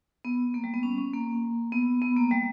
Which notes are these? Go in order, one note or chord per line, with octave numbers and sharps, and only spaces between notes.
B3
A#3
G3
B3
C#4
C#4
A#3
B3
B3
A#3
G3